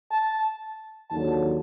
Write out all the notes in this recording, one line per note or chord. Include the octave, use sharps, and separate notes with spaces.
A5
D#2 D3 F#3 A5